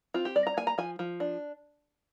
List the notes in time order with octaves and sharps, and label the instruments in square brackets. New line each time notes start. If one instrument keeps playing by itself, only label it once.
[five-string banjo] C4 F4
G4
G3 D5
A#5
A#3 G#5
A#5
F3 G#5
F3
D4